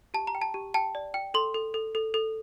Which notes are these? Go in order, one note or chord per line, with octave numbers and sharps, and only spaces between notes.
G4 A5
A#5
G5
A5
G4
G5 A5
D5
G5
A4 C6
A4
A4
A4
A4